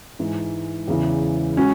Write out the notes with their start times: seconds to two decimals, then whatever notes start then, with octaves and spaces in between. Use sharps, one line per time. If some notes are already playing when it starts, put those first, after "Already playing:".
0.19 G#2 E3 G#3
0.88 E2 C#3 E3
1.56 G#3 C#4 F#4